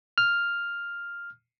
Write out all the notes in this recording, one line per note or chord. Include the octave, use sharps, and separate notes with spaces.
F6